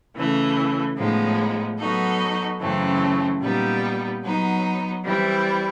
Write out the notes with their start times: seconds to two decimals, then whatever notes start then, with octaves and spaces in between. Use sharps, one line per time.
0.14 C#3 E3 A3
0.96 A2 F3 G#3 B3 D#4
1.78 F#3 B3 D#4 F#4 A4
2.60 F#2 C#3 E3 A3 C4
3.41 A#2 G3 B3 D#4
4.23 F#3 B3 D#4
5.05 E3 G3 C4 E4